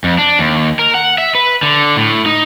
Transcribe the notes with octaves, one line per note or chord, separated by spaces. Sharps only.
F2
D4
D#2
A#4
F#5
E5
B4
D3
A2
D#4